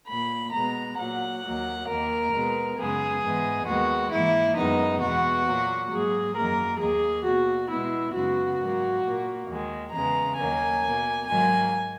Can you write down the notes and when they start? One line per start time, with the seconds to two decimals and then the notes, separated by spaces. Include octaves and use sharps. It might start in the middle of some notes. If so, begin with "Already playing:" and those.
0.09 A#2 A#3 B5
0.53 B2 G#3 B3 A#5
0.98 A#2 F#3 A#3 F#5
1.43 D#2 D#3 F#3 A#3
1.88 D#2 D#3 A#3 A#4
2.32 B2 G#3 B3
2.76 F#2 C#3 G#3 B3 G#4
3.21 G#2 E3 B3
3.66 D#2 D#3 G#3 B3 F#4
4.11 G#2 E3 A#3 E4
4.56 F#2 D#3 G#3 B3 D#4
5.01 E2 B2 G#3 B3 F#4
5.46 A#2 F#3 A#3
5.90 G#2 F#3 A#3 G#4
6.35 F#2 D#3 F#3 A#3 A#4
6.79 D#2 D#3 A#3 G#4
7.24 B2 A#3 F#4
7.69 B2 G#3 B3 E4
8.14 F#2 C#3 G#3 B3 F#4
8.59 G#2 F#3 A#3
9.04 A#2 A#3
9.48 D#2 D#3 G#3
9.92 E2 C#3 E3 G#3 B3 A#5
10.37 D#2 D#3 F#3 A#3 G#5
10.82 B2 A#3
11.26 G#2 D#3 F#3 A#3 G#5